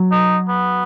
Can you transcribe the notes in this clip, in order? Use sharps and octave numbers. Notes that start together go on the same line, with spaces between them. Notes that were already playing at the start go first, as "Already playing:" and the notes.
Already playing: F#3
D#4
B3